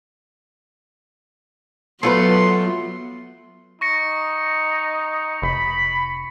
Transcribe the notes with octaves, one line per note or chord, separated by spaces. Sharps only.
F#3 A3 B3 F4 B4 C6
D#4 C#6 A#6 C#7
F1 B5